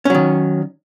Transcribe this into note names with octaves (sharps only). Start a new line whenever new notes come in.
D#3 F#3 C#4